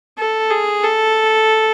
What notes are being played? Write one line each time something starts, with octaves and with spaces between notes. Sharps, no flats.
A4
G#4
A4